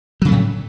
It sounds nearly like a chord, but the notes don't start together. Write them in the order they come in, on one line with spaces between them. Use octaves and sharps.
F#3 C#3 A3 A2